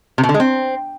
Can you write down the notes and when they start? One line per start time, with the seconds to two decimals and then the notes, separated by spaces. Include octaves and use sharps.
0.18 C3
0.23 B2
0.29 D3
0.34 G#3
0.40 C4